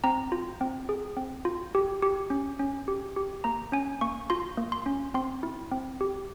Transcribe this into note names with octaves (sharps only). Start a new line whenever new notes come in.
C4 A#5
F4
C4
G#4
C4
F4
G4
G4
C#4
C#4
G4
G4
A#3 A#5
C#4 G#5
A#3 C#6
F4 C6
A#3
C6
C#4
C4 C6
E4
C4
G4